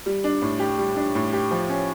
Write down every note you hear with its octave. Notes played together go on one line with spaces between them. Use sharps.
G3
D4
A2
G4
G3
D4
A2
G4
F3
C#4